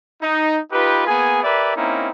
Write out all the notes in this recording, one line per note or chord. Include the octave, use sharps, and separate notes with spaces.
D#4
D#4 F4 G4 B4
A#3 B3 G#4 G#5
G4 A#4 B4 D5 E5
A#3 C4 C#4 D#4 E4